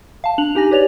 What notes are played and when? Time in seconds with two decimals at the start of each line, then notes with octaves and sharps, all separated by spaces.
0.24 F5 A5
0.38 D4 F7 F#7
0.55 D#4 G4 G#5 A#6
0.71 G4 B4 C#5 D5 F7